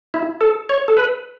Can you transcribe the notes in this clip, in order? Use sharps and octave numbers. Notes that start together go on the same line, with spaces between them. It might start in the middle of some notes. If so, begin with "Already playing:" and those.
E4
A4
C#5
A4
B4